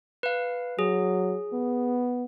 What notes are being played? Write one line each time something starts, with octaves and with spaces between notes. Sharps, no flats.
B4 F5
F#3 G#4
B3